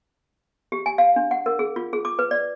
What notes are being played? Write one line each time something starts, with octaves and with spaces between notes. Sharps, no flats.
G4
G#5
F5
D4
F#5
A#4
G#4
F4
G#4
D6
B4
D5